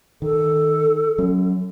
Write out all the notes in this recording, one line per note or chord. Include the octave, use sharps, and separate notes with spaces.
D#3 A4
F#3 C#4